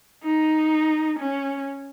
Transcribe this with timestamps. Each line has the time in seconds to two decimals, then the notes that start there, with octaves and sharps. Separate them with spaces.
0.24 D#4
1.19 C#4